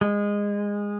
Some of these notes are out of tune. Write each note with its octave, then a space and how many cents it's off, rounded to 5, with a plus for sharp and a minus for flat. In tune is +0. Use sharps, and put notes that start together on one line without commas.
G#3 -20